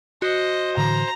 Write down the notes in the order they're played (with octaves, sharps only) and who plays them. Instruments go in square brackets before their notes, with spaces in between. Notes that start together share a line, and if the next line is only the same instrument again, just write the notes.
[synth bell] F#4 [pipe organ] C5 [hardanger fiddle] D#5
[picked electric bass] A2 D3 E3 [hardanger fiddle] A#5